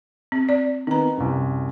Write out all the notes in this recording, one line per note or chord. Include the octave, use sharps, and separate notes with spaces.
C4
C4 D5
D#3 B3 C4 A#5
C2 F#2